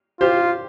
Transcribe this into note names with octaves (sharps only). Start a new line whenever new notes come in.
F4 G4 C5